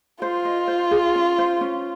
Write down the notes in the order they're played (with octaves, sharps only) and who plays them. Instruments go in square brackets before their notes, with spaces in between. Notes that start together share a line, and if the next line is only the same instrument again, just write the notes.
[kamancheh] F4 [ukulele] C5
[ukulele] D#5
C5
G#4
C#4
C5
C#4